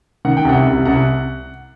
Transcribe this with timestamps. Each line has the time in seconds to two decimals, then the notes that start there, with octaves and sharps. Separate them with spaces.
0.25 D#3 F#5
0.37 G5
0.45 C2 F#5
0.65 C2
0.85 C2 F#5